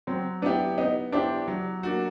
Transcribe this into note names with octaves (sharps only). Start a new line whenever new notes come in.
F#3 C4
B3 D4 E4 G4
B3 D#4
D4 E4 G4 C5
F#3
A#3 D4 F#4